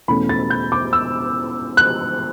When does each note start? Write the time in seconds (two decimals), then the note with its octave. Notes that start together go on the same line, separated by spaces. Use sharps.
0.08 E2 B2 A3 C#4 B5
0.29 A6
0.50 G6
0.72 D6
0.93 E6
1.77 F#6